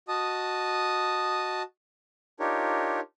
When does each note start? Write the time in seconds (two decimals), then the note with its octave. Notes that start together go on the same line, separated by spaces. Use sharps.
0.08 F#4 D#5 A5 D#6
2.40 D4 D#4 F4 G4 A#4 C#5